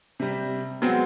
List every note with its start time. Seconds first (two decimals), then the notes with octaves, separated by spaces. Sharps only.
0.20 C3 G3
0.82 F#3 G#3 B3 C4 F#5